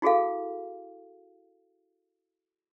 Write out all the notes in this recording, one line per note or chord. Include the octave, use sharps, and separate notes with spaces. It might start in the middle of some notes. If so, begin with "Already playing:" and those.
E4 F#4 G#4 A4 F5